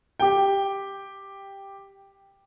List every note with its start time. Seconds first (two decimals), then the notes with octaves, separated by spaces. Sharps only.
0.20 G4 G5